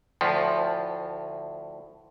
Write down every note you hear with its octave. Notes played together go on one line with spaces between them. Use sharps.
D2 A2 F3